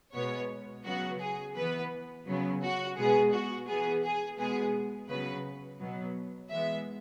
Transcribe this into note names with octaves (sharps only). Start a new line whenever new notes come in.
B2 G#3 B3 C#5
C#3 F#3 B3 F#4
G#4
E3 B3 B4
C#3 F#3 B3
F#4
B2 G#3 B3 G#4
F#4
E3 B3 G#4
G#4
B2 G#3 B3 G#4
C#3 F#3 B3 B4
B2 F#3 B3
E3 G#3 B3 E5